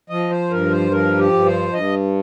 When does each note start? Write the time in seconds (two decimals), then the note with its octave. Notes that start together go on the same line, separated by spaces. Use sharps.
0.10 F3 D#5
0.31 C5
0.51 G2 A#4
0.72 C5
0.92 F3 A#4
1.19 G4
1.32 G2
1.45 C5
1.73 G2 D#5